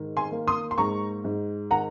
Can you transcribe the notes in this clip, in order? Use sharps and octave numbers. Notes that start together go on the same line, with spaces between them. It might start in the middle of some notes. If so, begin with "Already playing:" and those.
Already playing: G#2 D#3
G#5 C6
A#3
C6 D#6
C6
G#2 A#5 C#6
G#2
D#3 F#5 A#5